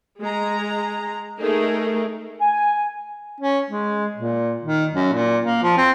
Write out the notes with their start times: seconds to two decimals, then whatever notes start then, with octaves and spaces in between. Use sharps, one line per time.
0.23 G#3 A#5
1.41 A3 D#4 G#4 A#4
2.40 G#5
3.40 C#4
3.70 G#3
4.16 A#2
4.63 D#3
4.94 F#2
5.13 A#2
5.43 A#3
5.63 F3
5.77 C4